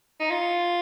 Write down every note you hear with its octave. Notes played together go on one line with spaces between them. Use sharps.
D#4
F4